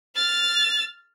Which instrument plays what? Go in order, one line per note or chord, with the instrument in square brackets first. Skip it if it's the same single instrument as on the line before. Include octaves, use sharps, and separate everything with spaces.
[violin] F6 A6